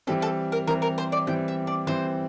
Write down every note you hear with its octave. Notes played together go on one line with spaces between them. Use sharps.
E3 G3 C4 A4
A4
A#4
E3 G3 C4 A#4
A#4
C5
D5
E3 G3 C4 G5
E5
D5
E3 G3 C4 C5